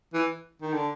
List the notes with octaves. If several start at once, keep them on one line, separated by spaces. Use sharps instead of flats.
E3
D#3
D3